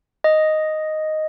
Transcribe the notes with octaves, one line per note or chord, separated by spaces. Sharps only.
D#5